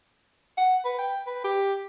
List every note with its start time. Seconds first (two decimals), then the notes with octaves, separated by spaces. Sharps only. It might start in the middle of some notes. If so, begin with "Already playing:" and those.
0.58 F#5
0.85 B4
0.99 G5
1.27 B4
1.44 G4